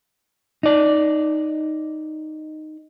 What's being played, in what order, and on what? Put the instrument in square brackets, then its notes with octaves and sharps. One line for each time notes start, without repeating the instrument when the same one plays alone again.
[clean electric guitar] D#4 D5